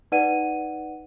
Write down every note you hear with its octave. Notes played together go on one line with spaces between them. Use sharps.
D#4 B4 D5 F#5 D#7